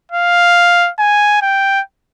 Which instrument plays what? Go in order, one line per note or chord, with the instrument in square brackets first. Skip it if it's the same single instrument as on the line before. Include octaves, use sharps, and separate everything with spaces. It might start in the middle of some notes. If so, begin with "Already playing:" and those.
[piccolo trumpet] F5
G#5
G5